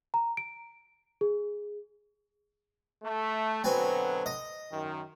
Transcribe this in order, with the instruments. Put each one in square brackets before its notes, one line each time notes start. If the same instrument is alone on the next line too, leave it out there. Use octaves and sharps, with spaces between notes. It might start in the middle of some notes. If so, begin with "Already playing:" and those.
[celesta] A#5
D7
G#4
[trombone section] A3
[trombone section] B2 D3 F#3 [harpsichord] C4 B4 G#5
[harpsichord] D#5
[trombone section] F#2 D#3